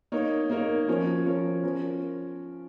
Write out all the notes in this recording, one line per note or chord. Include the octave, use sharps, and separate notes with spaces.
A#3 D#4 A#4 C#5
A#3 D#4 A#4 C#5
F3 C#4 A#4 C#5
F3 C#4 A#4 C#5
F3 C#4 A#4